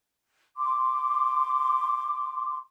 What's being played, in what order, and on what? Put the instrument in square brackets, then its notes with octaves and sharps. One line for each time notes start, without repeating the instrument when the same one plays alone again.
[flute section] C6 D6